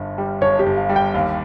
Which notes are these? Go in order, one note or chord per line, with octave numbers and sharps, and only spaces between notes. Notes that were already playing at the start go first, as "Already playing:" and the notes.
Already playing: G1 G2
G3
G1 C#5
G4
G1
F5
G3
G5
D#2 F5